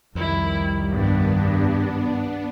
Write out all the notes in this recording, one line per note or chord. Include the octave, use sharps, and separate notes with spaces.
C2 F2 D#3 G3 E4
G2 B3 D4